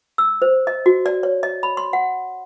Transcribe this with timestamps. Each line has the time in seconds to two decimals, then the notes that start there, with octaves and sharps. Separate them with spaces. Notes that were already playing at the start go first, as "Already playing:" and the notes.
0.18 E6
0.42 C5
0.67 D#5
0.86 F#4
1.06 D5
1.23 C#5
1.43 D#5
1.63 B5
1.77 C6
1.93 F#5